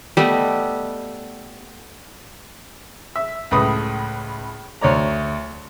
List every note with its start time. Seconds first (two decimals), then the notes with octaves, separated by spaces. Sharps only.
0.17 G3 A3 B3 D#5
3.16 E5
3.51 C#2 A2 B4 D#6
4.81 D2 C#5 D5 A#5